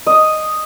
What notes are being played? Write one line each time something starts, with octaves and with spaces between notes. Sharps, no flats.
D#5